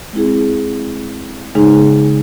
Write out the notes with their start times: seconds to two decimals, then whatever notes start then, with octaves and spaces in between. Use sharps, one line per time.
0.13 G#3 C4 E4 G#4
1.55 C#3 G#3 D#4 G#4